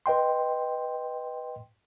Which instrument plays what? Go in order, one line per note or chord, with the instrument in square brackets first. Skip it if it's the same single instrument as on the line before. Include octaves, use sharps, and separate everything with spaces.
[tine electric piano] B4 D#5 G5 C6